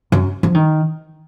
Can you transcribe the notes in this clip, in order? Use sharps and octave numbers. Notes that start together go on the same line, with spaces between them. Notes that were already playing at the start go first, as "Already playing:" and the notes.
F#2
F3
D#3